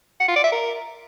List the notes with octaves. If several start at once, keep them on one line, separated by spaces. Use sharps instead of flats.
F#5
F4
D5
E5
A#4